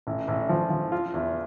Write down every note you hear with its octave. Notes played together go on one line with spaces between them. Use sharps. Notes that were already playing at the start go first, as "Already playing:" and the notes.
A1
A1
F3
F3
F4
E2